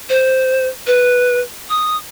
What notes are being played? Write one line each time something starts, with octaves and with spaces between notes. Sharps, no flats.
C5
B4
D#6